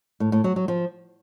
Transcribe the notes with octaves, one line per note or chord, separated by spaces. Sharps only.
A2
A2
F#3
F#3
F3